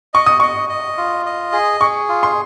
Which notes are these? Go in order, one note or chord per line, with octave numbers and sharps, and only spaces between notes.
D#5 C#6
D#6
D#5 C#6
D#5
F4
D#5
G#4
G#4 C#6
F4
C6